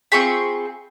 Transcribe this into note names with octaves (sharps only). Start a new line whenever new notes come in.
C4 F4 G#4 B5 C#6